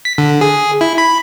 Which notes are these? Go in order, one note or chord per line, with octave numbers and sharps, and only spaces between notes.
B6
D3
G#4
E4
B5